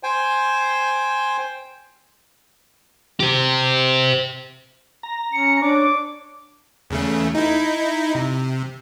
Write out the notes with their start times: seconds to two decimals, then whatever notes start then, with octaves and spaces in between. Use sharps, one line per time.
0.03 C5 G5 G#5
3.20 G4 C5
5.03 A#5
5.33 C#4 C#7
5.62 D4 C#5 D6
6.90 E2 C#3 A3
7.35 D#4 E4
8.15 C3